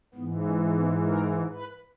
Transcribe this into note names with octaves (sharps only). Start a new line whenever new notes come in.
G#2 E3 B3
C#4
B3
A#4
B4